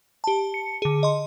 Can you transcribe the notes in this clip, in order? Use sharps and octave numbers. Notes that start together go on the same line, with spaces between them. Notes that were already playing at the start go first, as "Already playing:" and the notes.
G4 A5
C#7
D3 G#4
D#5 C6